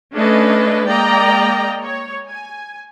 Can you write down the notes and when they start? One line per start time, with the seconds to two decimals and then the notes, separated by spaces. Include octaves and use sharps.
0.14 A3 C#4 D4 B4 D#5
0.87 G#3 A#3 D5 D#5 G5 A#5
1.83 C#5
2.28 G#5